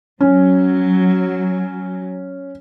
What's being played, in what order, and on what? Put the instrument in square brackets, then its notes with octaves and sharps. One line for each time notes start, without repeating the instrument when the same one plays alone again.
[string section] F#3 [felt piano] C#4